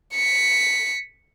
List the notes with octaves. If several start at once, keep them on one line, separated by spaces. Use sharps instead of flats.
B6 C#7